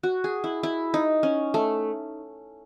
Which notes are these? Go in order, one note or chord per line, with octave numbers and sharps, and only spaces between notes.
F#4
G#4
E4
E4
D#4
C#4
A3